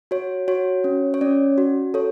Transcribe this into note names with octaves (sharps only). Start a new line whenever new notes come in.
F#4 C#5
F#4 C#5
C#4
C#5
C#4 D5
F#4
A4 C#5